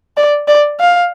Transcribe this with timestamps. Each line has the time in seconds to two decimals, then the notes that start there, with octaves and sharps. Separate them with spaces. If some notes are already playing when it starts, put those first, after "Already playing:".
0.17 D5
0.48 D5
0.80 F5